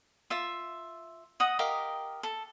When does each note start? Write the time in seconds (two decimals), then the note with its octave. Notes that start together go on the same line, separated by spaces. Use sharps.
0.30 F4 E5
1.40 D#5 F#5 D#6
1.59 G4 A#4 D#5 F5
2.23 A4